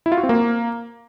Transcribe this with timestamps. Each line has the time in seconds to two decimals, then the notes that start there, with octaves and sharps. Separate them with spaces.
0.06 E4
0.12 F4
0.18 F#4
0.23 C4
0.29 A#3